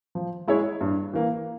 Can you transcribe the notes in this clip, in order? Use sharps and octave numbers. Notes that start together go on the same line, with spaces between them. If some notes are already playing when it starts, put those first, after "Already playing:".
F3
G#3 E4 G#4 C#5
G2
E3 A#3